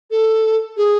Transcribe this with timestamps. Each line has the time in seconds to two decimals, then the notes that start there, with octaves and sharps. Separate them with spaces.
0.11 A4
0.77 G#4